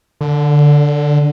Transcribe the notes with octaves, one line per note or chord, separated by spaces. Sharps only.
D3